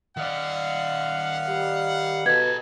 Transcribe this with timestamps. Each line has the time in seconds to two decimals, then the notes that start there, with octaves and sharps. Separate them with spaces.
0.17 D#3 D5 F5 F#5
1.48 G3
2.26 B2 G4 A4 G#6